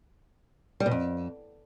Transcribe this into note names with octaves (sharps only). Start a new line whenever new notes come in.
G3
B2
F2